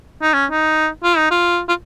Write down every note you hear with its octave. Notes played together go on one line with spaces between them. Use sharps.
D#4
C#4
D#4
F4
D#4
F4
F4